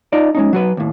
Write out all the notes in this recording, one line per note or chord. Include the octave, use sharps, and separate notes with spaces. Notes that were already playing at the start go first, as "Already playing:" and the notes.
D#4 F4 D5
G#3 C#4 D#4
F#3 F#4 B4
D#2 A2